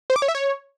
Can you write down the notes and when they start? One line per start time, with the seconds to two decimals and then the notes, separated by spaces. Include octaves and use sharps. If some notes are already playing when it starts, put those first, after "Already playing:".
0.10 C5
0.16 D6
0.22 C#5
0.28 E5
0.35 C#5